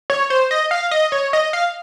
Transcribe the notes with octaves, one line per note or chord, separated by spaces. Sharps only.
C#5
C5
D#5
F5
D#5
C#5
D#5
F5